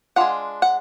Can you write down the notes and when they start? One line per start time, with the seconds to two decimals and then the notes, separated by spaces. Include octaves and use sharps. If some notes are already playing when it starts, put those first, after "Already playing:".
0.16 G#3 D4 F4 F#5
0.62 F#5